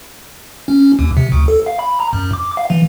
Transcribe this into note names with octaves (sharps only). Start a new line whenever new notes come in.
C#4
D#2
C3
D2
A4
F5
B5
A#5
F#2
D6
F5
E3